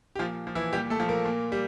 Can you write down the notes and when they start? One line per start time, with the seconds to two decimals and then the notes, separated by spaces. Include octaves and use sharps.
0.15 G4
0.19 A#2 F3 F4
0.47 F3
0.55 E3 E4
0.73 A#2 G3 G4
0.90 A3 A4
1.00 F3
1.09 A#3 A#4
1.25 A#2
1.52 G3